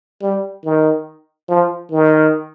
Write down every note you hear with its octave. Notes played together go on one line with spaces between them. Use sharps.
G3
D#3
F3
D#3